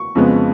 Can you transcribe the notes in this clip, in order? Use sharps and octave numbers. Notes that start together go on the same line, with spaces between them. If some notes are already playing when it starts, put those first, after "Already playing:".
Already playing: C#6
F2 C#3 F3 G#3 B3